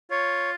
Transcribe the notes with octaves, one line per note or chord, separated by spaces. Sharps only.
F4 C#5